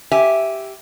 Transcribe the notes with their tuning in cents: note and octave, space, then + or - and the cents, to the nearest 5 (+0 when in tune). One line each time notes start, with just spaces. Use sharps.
G4 -5 E5 +0 G#5 +0